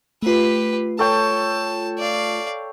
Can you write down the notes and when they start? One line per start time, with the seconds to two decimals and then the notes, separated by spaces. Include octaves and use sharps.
0.22 A3 F4 G4 B4
0.99 A4 C#5 G5 A5
1.99 D5 F5